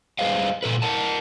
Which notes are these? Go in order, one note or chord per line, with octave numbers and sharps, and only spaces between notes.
G3 G#4 B4 C5 D#5 F5
A#2 A4 B4
A#4 F#5 A5